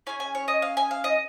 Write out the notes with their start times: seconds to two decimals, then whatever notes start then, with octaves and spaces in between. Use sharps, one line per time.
0.07 C#4 G#4 G#5
0.20 G#5
0.35 C#5
0.48 D#5
0.62 F5
0.77 G#5
0.91 F5
1.04 D#5